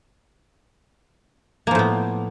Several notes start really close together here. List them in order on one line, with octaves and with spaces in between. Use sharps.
A#3 F3 A2 B3